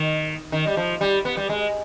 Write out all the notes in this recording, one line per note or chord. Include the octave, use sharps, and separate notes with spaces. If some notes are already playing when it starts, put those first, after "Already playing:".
Already playing: D#3
D#3
G3
F3
G3
B3
G3
G#3